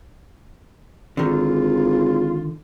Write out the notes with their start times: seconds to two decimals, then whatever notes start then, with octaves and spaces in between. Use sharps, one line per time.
1.17 G#1 D3 D#3 F4